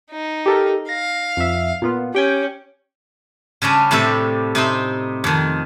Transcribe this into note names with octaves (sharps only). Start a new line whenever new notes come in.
D#4
G4 A4 A#4
F5 A#6
F2 E5
A#2 B3 F4
C#4 G4 G5 G#5
C#3 G3 C#4 D4
A2 C3 G3 D4 A4
C3 D#4 C5
F2 D#3